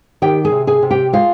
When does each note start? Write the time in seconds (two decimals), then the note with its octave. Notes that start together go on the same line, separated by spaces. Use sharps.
0.22 D#3 G4 G5
0.45 G#4 G#5
0.52 C3
0.67 G#4 G#5
0.82 C3
0.91 G4 G5
1.13 G#3 F4 F5